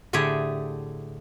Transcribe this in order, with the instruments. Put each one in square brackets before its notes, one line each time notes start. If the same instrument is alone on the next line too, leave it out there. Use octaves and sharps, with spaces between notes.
[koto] A2 D3 A3 G4 G#4